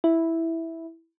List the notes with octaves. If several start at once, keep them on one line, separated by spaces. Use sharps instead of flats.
E4